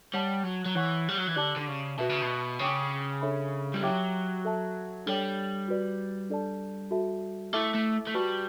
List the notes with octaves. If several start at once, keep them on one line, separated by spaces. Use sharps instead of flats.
G3 C#5 F#5 A5
F#3
F#3
E3 C#5 F#5 C#6
G3
F#3
E3
D3 G4 D5 A5 D6
D3
C#3
B2 F#4 B4 E5 A5
C#3
B2
C#3 C#5 G5 D6
D4 A4 C#5 E5 B5
G3
F#3 G4 C#5 E5 G5 D6
A4 E5 A5
G3 D4 A4 C#5 G5
F#4 B4 D5
D4 A4 D5 A5
F#4 A4 E5 A5
A3 E4 A4 E5 A5 D6
A3
A3
G3 F#4 B4 D5 A5 C#6